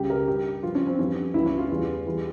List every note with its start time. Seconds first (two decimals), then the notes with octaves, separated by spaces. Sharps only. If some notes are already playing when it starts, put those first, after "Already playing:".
Already playing: C#2 C#3 G3 G4
0.10 A#4
0.27 G2 G3 G4
0.63 G2 F3 F4
0.75 C#4
0.87 C4
0.99 F2 E3 G3 C#4
1.34 C#2 C#3 E3 G3 E4
1.46 C#4
1.58 F4
1.70 E2 E3 G3
2.06 E2 E3 G3